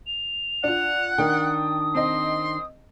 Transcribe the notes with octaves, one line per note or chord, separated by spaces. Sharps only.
F7
D4 F4 F#5
D#3 D4 G5 D#6
C4 D#5 C6